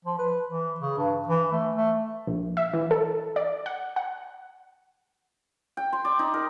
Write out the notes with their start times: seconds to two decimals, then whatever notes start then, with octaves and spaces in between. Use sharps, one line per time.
0.05 F3
0.19 B4
0.47 E3
0.80 C#3
0.97 G2
1.28 E3
1.52 A3
1.75 A3
2.27 A#1
2.57 E5
2.73 E3
2.91 A4
3.36 D5
3.66 F#5
3.96 F#5
5.77 G5
5.92 C6
6.05 D5
6.19 D#4
6.34 A#4